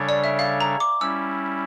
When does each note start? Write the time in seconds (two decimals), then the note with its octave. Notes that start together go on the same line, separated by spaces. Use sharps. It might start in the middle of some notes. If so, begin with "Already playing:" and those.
Already playing: C#3 G3 D4 A4 C#5
0.09 D5
0.24 E5
0.39 F5
0.60 A#5
0.80 D6
1.01 G3 C#4 E4 E6